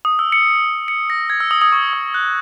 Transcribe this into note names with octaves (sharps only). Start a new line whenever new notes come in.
D#6
E6
C#7
C#7
A#6
G#6
E6
D#6
D#6
C#6
D#6
F#6